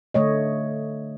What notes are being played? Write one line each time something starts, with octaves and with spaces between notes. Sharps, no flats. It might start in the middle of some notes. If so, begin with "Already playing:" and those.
D3 A3 C#5 D#5